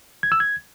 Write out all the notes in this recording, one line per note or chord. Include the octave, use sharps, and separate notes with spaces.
G#6
E6
G#6